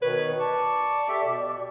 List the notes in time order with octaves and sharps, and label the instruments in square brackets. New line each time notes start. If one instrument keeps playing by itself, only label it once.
[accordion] B2 D#3 C#5 [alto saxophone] B4
[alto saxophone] D5 [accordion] A5 C#6
[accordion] G4 A4 E5
B2